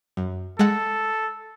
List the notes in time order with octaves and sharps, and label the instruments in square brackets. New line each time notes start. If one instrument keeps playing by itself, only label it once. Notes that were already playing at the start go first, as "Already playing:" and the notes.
[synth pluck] F#2
[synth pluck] G#3 F#5 [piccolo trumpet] A4